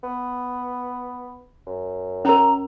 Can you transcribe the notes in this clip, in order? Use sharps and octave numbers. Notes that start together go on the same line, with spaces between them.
B3
F#2
C#4 A#4 A#5